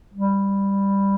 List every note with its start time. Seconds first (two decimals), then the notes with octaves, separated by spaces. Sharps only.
0.14 G3